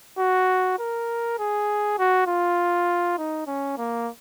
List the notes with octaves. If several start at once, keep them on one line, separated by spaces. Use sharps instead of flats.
F#4
A#4
G#4
F#4
F4
D#4
C#4
A#3